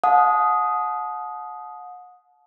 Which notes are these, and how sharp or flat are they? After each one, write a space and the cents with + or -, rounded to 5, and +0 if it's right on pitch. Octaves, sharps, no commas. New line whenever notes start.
F#5 -35 A5 -35 D#6 +0